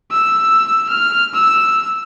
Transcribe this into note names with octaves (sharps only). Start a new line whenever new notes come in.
E6
F6
E6